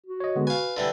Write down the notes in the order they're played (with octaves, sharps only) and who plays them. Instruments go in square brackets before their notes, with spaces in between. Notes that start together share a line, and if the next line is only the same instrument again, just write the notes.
[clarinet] F#4
[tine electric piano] C#5 D#5
D3 G#3 B3
[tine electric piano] B4 [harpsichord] F5 G#5
[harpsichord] D3 E3 G3